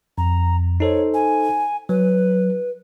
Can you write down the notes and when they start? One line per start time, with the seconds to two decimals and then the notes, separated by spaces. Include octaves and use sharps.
0.18 F2 A#5
0.80 D#4 A4 C5 C#5
1.14 G#5
1.89 F#3 B4